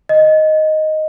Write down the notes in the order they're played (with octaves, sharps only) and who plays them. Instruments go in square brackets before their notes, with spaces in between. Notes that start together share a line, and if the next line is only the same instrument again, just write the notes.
[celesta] D#5